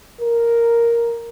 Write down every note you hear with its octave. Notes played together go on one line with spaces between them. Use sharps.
A#4